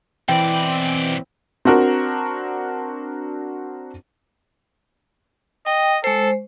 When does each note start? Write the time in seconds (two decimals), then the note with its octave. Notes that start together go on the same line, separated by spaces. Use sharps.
0.29 B2 E3 C4 D5 G5
1.65 C4 D4 F#4 A#4
5.67 D#5 G5
6.04 G#3 A4 C5